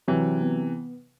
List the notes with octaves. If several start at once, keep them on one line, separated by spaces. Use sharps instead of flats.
C3 E3 F#3
B3